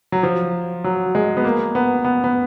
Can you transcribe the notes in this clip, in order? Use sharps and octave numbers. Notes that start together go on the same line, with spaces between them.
F#3
F3
F#3
G#3
B3
A#3
B3
B3
B3